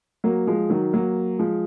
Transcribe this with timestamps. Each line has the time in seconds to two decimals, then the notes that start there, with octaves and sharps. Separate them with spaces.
0.24 F#3 A#3
0.47 F3 G#3
0.70 D#3 F#3
0.93 F#3 A#3
1.39 F3 G#3